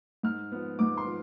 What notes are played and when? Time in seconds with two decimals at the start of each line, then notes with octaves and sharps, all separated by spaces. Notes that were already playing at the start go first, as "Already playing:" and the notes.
0.23 G#2 F6
0.52 F3 B3
0.79 G#2 D6
0.98 C6
1.07 F3